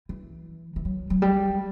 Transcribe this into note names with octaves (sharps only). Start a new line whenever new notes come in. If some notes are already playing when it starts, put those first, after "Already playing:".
E3
E3
F#3
F#3
G3